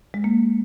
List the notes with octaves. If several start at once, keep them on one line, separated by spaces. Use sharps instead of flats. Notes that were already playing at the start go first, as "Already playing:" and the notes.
G#3
A#3